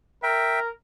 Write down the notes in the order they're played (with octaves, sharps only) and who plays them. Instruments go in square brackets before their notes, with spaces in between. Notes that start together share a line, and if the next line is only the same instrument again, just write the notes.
[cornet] A#4 [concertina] E5 G5